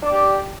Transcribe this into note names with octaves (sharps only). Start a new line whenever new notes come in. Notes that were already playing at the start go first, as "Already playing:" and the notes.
D4 G4 D5 G5